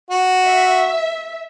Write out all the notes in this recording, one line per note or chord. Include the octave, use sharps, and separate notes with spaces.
F#4
E5